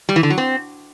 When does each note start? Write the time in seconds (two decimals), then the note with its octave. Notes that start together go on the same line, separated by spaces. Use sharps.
0.09 G3
0.16 E3
0.23 D3
0.30 F#3
0.38 C4